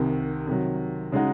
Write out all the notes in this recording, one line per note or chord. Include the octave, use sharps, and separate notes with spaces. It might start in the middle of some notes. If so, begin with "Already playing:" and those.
Already playing: C2 C3 D#3
C3 D#3 F#3
C#3 G#3 D#4 F#4